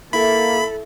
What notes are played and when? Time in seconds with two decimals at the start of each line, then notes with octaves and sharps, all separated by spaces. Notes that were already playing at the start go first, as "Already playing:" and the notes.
0.13 A#3 E4 A4 B5